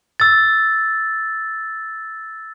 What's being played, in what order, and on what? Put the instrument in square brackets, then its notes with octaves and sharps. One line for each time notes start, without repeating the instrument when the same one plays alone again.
[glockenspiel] E6 A6